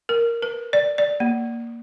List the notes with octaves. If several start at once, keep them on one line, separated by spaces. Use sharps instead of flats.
A#4
B4
D5
D5
A#3